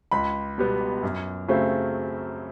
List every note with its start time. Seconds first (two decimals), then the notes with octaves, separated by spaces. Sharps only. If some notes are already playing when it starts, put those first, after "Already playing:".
0.11 C#2 B5
0.58 B2 G3 B3
1.03 F#2
1.48 C#3 F#3 A3 C4